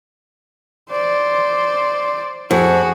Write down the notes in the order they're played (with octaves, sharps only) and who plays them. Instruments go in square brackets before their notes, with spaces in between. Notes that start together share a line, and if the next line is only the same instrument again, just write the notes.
[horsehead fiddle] C5 D5
[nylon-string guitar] F2 [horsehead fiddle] F#4 G#4